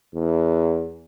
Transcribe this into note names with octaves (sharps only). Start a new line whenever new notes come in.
E2